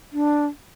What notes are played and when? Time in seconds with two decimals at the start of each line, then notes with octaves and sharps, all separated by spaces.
0.13 D4